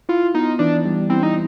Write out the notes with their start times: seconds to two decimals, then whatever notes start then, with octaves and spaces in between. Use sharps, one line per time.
0.09 E4 F4
0.35 B3 D#4
0.59 E3 D4
0.85 G3
1.10 C4 E4
1.23 D#4